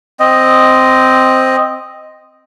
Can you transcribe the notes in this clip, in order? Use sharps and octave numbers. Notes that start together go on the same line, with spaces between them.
C4 D#5